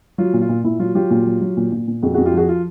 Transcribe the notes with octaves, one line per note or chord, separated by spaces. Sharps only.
F#3 F4
A#2
F4
A#2
A#2 E4
F#3 F4
F#3 F4 G4
A#2
F#3
F#3
A#2
A#2
A#2
F2 F#4 G#4
F#4 G#4
F2
F4 G4
F3 F#4 G#4
F4